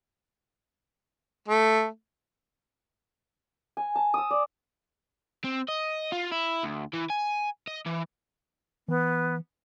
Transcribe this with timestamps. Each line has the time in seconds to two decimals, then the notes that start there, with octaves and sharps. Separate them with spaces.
1.49 A3
3.77 G#5
3.96 A5
4.14 D#6 E6
4.31 D5
5.44 C4
5.68 D#5
6.12 F4
6.32 E4
6.64 D2
6.93 E3
7.10 G#5
7.67 D#5
7.86 E3
8.88 E3 B3